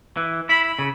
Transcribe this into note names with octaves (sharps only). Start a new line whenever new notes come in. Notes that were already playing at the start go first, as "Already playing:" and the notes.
E3
E4 B5
B5
C#3